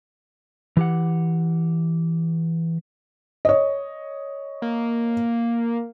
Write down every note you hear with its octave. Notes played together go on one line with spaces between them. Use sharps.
E3 G4 F#5
C#5 D#5
A#3